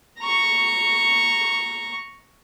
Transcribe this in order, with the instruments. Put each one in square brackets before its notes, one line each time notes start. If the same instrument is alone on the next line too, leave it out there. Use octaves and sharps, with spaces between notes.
[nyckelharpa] A#5 C#6